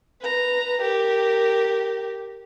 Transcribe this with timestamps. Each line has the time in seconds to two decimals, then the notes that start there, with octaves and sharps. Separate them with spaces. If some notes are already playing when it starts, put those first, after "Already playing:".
0.21 B4 A#5
0.82 G4 A#4